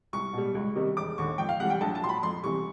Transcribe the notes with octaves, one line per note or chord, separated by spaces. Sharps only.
C2 C#6
B2 G3
C#2
C3 D#3 G3
E1 D6
D#2 D3 C#6
F2 G5
F5
C3 E3 G3 F#5
G5
A#1 A5
A5
A#2 F#3 C6
B5
F2 C6
C3 E3 G3 C#6